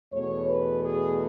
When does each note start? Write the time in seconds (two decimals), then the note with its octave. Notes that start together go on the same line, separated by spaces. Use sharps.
0.12 E2 B2 A3 C#5
0.48 B4
0.84 G#4